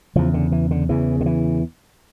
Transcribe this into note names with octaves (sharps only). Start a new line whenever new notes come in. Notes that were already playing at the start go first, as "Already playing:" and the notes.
E2 C#3 F3
D3
E3
D3
E2 C#3 E3
D3
E3